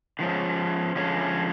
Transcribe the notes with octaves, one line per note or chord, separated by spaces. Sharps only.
D3 F3 G#3 C#4
D3 F3 G#3 C#4